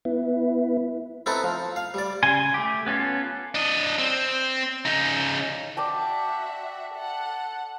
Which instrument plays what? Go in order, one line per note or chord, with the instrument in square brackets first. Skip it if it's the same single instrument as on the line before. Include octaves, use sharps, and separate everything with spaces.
[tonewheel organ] B3 E4
[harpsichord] C4 D#4 E4 A4 B4
F3
F5
G3 D5
[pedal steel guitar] C#3 G#5 C6
A3 G4
B3 C#4 F4 A4
[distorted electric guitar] D4 D#5
C4
C#3 D#4
[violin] F#4 E5 [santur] D5 G5 A5
[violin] A4 F#5